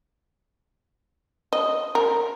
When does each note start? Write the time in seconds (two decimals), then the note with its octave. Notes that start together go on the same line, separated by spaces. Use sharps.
1.53 D#5
1.95 A#4